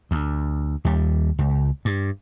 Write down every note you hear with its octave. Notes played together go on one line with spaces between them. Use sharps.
D2
D#2 G3
C#2
G2